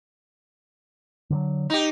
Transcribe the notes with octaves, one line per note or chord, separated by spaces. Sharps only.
D3 E3 F#3
D#4 G4